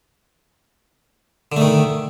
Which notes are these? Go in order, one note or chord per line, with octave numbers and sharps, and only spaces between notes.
D3 D#3 A3